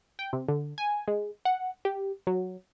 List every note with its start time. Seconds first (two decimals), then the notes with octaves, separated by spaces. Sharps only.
0.19 G5
0.33 C3
0.48 D3
0.78 G#5
1.08 G#3
1.45 F#5
1.85 G4
2.27 F#3